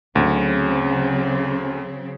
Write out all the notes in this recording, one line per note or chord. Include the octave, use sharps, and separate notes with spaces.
D2 C#3 F#3 C4